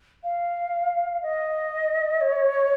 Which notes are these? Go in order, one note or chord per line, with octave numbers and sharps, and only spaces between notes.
F5
D#5
C#5